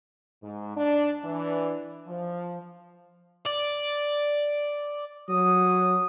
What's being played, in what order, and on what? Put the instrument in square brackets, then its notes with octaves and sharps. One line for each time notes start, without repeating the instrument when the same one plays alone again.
[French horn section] G#2
D4
E3 D4
F3
[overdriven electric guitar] D5
[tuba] F#3 [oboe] D#6